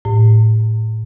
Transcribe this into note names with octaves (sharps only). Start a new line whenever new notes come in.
A2